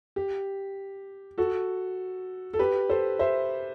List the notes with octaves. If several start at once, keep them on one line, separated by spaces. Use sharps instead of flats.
G4
F#4 A4
A4
G4 B4
A4 C5
C5 E5